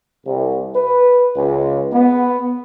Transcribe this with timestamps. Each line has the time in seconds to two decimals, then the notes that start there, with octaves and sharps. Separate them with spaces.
0.27 C2
0.75 B4
1.36 C#2
1.92 B3